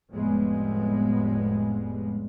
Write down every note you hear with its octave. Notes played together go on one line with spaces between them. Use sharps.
F1 F2 A2 G3 G#3 B3